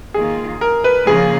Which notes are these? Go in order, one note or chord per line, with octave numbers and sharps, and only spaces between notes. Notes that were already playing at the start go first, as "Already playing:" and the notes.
D#3 A#3 F4 G#4
A#4
B4
C#3 F3 A#3 F4 G#4